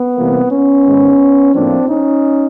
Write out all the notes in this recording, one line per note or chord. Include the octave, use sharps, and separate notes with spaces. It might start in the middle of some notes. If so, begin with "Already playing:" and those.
Already playing: B3
C3 E3 G3 A#3
B3 C#4
G#2 D#3 G#3
A2 F3 A#3 C4 D4
C#4 D#4